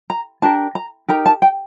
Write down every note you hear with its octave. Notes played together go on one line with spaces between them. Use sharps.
A#5
D4 G4 A#4 A5
A#5
D#4 G4 A#4 A#5
A5
G5